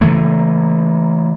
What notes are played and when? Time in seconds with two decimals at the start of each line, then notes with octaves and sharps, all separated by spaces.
0.01 C#3 E3 A3 A#3